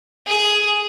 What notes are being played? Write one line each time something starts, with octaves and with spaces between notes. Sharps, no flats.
G#4